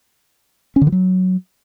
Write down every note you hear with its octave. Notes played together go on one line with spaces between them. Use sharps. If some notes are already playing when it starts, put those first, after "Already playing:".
C#4
D3
E3
F#3